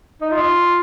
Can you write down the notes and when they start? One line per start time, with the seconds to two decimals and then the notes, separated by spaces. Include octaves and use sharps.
0.21 D#4
0.32 F4